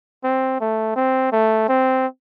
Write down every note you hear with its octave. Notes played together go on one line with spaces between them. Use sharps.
C4
A3
C4
A3
C4